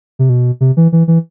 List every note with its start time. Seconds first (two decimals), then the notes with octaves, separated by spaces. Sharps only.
0.19 C3
0.29 B2
0.61 C3
0.77 E3
0.92 E3
1.08 E3